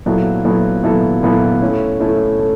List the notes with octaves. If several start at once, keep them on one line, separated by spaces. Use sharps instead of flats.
A#2 F#3 B3 E4 A4
A#2 F#3 B3 E4 A4
A#2 F#3 B3 E4 A4
A#2 F#3 B3 E4 A4
A3 C#4 E4
A3 C#4 E4
A3